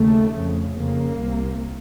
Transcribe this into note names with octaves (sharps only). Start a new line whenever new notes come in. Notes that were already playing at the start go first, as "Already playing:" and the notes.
Already playing: D#2 C#3 A3
F2 C#3
F2 C#3 A#3
C2 C3